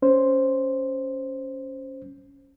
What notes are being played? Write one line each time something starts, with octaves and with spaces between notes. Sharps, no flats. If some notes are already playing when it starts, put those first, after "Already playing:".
C#4 C5